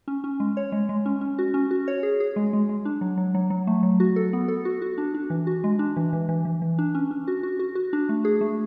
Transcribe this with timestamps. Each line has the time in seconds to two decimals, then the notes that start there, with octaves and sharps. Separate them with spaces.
0.08 C#4
0.24 C#4
0.40 G#3
0.57 C#5
0.72 G#3
0.89 G#3
1.06 C#4
1.21 C#4
1.39 F#4
1.54 C#4
1.71 F#4
1.88 C#5
2.03 G#4
2.20 G#4
2.36 G#3
2.53 G#3
2.69 G#3
2.85 D4
3.01 F#3
3.17 F#3
3.34 F#3
3.50 F#3
3.67 A3
3.83 F#3
4.00 F#4
4.16 A4
4.33 B3
4.48 A4
4.65 F#4
4.82 F#4
4.98 D4
5.14 D4
5.30 E3
5.47 F#4
5.64 G#3
5.79 D4
5.97 E3
6.13 E3
6.29 E3
6.45 E3
6.62 E3
6.78 D4
6.95 C#4
7.11 C#4
7.28 F#4
7.43 F#4
7.59 F#4
7.75 F#4
7.93 D4
8.09 A3
8.25 G#4
8.41 A3